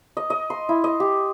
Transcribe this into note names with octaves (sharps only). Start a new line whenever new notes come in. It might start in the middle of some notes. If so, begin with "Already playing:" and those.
D#5
D#5
C6
E4
D#5
G4